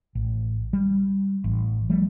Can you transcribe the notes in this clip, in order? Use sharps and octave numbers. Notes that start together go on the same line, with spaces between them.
A1
G3
A1
F3 G3 A3